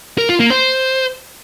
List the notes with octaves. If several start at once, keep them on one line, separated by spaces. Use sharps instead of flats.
A#4
F4
A#3
C5